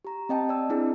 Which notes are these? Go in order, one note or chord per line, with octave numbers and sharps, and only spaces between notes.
G4 A#5
C4 D#5 G5 A5
D5 E6
C4 D4 E4 G#4